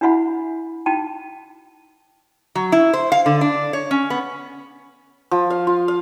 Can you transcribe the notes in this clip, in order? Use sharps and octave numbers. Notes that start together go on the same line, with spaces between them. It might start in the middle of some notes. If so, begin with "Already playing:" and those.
D4 E4 F#4 E5 F#5 B5
D#4 F#4 G5 A5
F#3
E4
C5
F5
D3
D4
C#5
C#4
B3
F3
F5
F4
F5